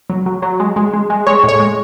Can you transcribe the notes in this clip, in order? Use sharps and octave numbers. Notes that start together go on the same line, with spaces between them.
F#3
F#3
F#3
G#3
G#3
G#3
G#3
G#3 C#5
A2 C#5
G#3